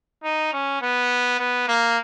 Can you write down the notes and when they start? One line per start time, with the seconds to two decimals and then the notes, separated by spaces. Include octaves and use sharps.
0.24 D#4
0.53 C#4
0.82 B3
1.39 B3
1.68 A#3